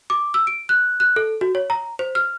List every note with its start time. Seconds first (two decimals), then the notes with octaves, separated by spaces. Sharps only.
0.10 D6
0.34 E6
0.47 D7
0.69 F#6
1.00 F#6
1.16 A4
1.41 F#4
1.55 C#5
1.70 A#5
1.99 C5
2.15 F6